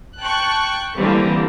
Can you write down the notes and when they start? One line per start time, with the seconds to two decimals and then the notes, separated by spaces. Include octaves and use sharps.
0.19 G5 A5 C#6 F#6
0.96 D3 E3 G3 A#3 C4